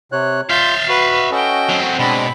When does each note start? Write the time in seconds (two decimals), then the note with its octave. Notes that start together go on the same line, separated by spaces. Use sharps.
0.12 C3 C#5 F#6
0.49 F4 E5 F5 G6 A6
0.88 F#4 B4
1.31 C#4 F#4 A4 D#5 G5
1.69 F#3 C4
1.99 B2 G#3 C4 D4 B5